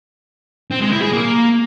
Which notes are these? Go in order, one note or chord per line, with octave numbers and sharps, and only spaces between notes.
C4
G#3
E4
G#4
A#3